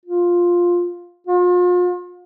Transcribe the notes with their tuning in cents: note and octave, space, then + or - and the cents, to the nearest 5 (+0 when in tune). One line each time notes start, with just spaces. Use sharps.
F4 +5
F4 +40